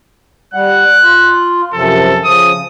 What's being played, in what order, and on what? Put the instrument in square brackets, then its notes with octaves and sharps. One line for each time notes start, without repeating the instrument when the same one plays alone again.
[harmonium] G3 F#5 [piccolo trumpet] F#6
[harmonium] F4
[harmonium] F#2 C3 F3 [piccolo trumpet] A4
[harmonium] C#3 F3 [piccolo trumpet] D#6